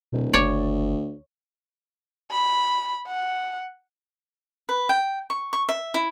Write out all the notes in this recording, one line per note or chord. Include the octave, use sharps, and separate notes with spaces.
D1 B2
F#1 D2 C#5 D5
B5
F#5
B4
G5
C#6
C#6
E5
E4